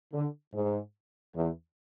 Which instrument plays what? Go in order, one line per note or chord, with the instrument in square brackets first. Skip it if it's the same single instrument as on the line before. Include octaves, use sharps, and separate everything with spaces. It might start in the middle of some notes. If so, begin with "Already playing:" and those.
[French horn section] D3
G#2
E2